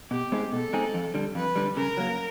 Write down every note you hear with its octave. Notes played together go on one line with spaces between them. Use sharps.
B2 G4
G#3 C4 D#4 G#4
B2 A4
G#3 C4 D#4 G#4
F2
D3 G3
F2 B4
D3 G3
C#3 A#4
F#3 A#3